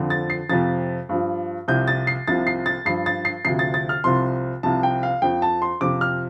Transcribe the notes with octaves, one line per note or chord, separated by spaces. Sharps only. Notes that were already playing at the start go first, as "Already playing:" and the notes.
Already playing: F2 D3 F3
A6
C7
F2 C3 F3 A6
G2 F3
C2 C3 F3 G6
A6
C7
C2 C3 F3 A6
C7
A6
G2 F3 C7
A6
C7
D2 C3 F3 C7
A6
A6
F6
C2 C3 F3 C6
C2 C3 F3 A5
G5
F5
F2 F3 G5
A5
C6
F2 C3 F3 D6
F6